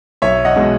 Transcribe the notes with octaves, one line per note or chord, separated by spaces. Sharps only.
B1 C#5 E5
D#5 F#5
B2 G#3